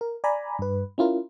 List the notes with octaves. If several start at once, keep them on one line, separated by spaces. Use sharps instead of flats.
A#4
D5 G#5 A#5 B5
G2 B4
C#4 E4 F4 A#4